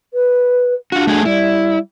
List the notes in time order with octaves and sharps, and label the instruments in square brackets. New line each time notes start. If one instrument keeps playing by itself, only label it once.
[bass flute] B4
[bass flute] D4 [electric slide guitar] F4 F#4
[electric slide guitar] A3 F#4 G#4
[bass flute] G3 [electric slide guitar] E4